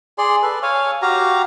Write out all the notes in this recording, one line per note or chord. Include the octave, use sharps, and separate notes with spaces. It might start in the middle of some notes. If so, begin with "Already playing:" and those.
G#4 D5 C6
A4 B4
C#5 F5 G#5
F#4 G4 F5 A#5